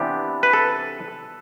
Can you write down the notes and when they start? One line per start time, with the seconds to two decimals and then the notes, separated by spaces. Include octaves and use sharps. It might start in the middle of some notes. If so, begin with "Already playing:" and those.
Already playing: C3 E3 B3 D4 G4
0.43 B4
0.53 A4